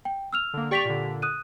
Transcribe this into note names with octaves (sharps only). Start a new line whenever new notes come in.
G5
E6 F6 F7
D3 A#3
G4 D5 G5 C#6 B6 F7
A#2 D3
D#6 F#6 D#7